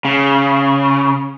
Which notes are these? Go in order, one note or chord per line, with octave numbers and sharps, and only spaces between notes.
C#3